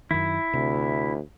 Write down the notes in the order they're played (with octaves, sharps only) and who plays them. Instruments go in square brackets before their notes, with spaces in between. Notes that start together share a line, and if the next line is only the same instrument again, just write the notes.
[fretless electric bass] F#2 D#3 [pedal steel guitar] E4
[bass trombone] D2 [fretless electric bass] C3